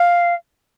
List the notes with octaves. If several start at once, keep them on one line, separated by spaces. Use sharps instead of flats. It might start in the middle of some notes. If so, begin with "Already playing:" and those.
Already playing: F5